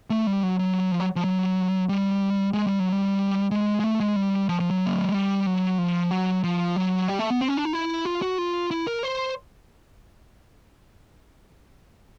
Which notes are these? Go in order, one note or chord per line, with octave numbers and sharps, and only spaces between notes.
A3
G3
F#3
F#3
F3
F#3
F3
F#3
G3
G#3
G3
F#3
G3
G#3
G#3
A3
G#3
G3
F3
F3
F#3
A#3
A3
G#3
G3
F#3
F3
F#3
F3
F#3
G3
A3
B3
C4
C#4
D4
D#4
E4
F4
F#4
F4
E4
A#4
C5